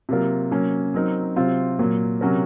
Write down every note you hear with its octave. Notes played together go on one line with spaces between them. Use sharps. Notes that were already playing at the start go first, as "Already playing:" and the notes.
C3 F#3 A#3 F4 A#4
C3 F#3 A#3 C#4
F#3 C4 D#4 A#4
C3 F#3 C4 F4
A#2 F#3 A#3
C3 F#3 C#4 F#4 A#4